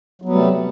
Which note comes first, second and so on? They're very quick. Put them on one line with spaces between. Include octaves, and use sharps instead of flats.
F#3 B3 G3 A3 C3